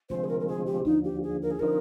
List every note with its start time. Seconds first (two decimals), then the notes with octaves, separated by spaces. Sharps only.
0.10 D2 C3 F3 G#3 C4 C5
0.24 G#4
0.28 A#4
0.40 A#4
0.48 G#4
0.66 G4
0.85 D#2 D3 F3 D#4
1.04 G4
1.23 G#4
1.42 A#4
1.51 G#4
1.59 D3 F3 C4 D#4 A#4